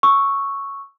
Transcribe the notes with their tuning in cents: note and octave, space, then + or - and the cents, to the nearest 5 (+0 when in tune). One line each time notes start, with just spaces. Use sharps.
C#6 +0 E6 +0